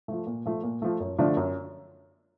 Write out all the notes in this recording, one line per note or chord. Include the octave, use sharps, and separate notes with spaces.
F3 A3
A#2
F3 A3
A#2
F3 A3
F#2
D3 F3 A3 D4
F#2